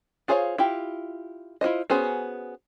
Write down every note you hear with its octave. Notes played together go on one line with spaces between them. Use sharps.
F4 G#4 C5 C#5 F5
E4 F4 G4
E4 F4 C5 D#5
B3 C#4 F#4 G#4 C5